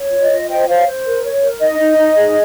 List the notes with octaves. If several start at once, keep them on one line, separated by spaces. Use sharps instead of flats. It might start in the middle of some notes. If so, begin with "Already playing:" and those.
Already playing: C#5
F4
D#5
F4
C5 D#5 G5
C5 C#5 F5
C5
A#4
C#5
A#4
D#4 D#5
D#4
D#4
G#4